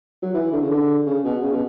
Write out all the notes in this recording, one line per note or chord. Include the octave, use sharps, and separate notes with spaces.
F#3
E3
D3
C#3
D3
C#3
B2
C#3
B2